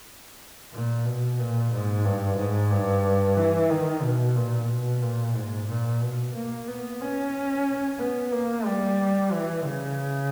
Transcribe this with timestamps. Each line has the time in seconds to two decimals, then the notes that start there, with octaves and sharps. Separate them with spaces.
0.73 A#2
1.05 B2
1.39 A#2
1.72 G#2
2.05 G2
2.38 G#2
2.71 G2
3.37 E3
3.70 D#3
4.02 B2
4.36 A#2
4.69 B2
5.02 A#2
5.35 G#2
5.68 A#2
6.01 B2
6.34 A#3
6.68 B3
7.01 C#4
7.99 B3
8.32 A#3
8.66 G3
9.32 E3
9.64 C#3